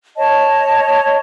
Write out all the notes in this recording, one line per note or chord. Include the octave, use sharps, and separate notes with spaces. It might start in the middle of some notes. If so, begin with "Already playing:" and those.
C#5 D#5 A5